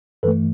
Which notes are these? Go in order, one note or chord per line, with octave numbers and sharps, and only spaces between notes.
G2 E3 A3 A4 B4